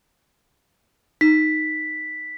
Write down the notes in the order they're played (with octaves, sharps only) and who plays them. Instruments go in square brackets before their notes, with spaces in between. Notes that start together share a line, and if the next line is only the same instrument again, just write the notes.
[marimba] D#4 [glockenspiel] B6